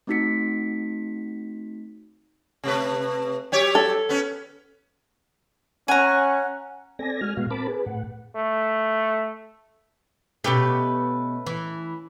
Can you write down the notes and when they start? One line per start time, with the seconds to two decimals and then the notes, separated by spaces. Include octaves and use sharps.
0.07 A3 C4 D#4 F#4 B6 C#7
2.64 C3 A3 B4
3.52 F#3 G4 C#5
3.75 A4
4.09 B3 C#4
5.88 C#4 F#5 G#5 A#5
6.99 C4 A4 D5 G#5 A#6
7.21 G#3 F#4 G#5 F6
7.37 A#2 G#3 B3 F#4 F5
7.51 C4 A#4 A5 B5 D6
7.68 G#4 B4
7.86 A2 F#5
8.36 A3
10.44 B2 A3 C#4 G4 B4
11.46 E3